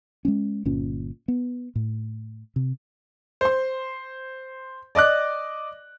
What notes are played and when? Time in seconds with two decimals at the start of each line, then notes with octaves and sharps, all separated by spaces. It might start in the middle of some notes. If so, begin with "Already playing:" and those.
0.25 G#3 A#3 C#4
0.65 G1 A#2 C#4
1.28 B3
1.75 A2
2.56 C3
3.41 C5 C6
4.95 D5 D#5 D6 F#6